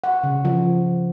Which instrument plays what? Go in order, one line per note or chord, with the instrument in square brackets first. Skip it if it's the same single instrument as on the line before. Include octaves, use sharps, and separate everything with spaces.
[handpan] F#5
C#3
F3